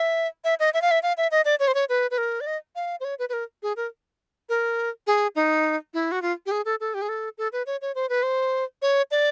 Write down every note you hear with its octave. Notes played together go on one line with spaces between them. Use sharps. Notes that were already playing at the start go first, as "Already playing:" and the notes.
Already playing: E5
E5
D#5
E5
F5
E5
F5
E5
D#5
D5
C#5
C5
C#5
B4
B4
A#4
D5
D#5
F5
C5
C#5
B4
B4
A#4
G#4
A#4
A#4
G#4
D#4
E4
F#4
F4
G4
G#4
A4
A4
G4
G#4
A4
A4
B4
C#5
C#5
C5
B4
C5
C#5
D5